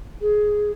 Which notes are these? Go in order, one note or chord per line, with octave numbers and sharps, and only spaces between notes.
G#4